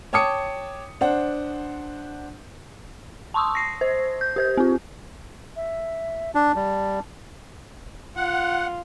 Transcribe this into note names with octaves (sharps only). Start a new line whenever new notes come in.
C#5 G5 A5 D6 D#6 C#7
D4 C5 F#5
A5 C6 C#6 D#6 E6
A#6 C7
C5
G6
G4 C5 G6
C4 F4
E5
D4 A5
G3
F4 F#5